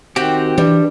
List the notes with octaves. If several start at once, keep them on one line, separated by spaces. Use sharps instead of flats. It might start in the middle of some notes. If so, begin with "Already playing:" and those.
D#3 C4 F#4 G4 G5
E3 G3 D4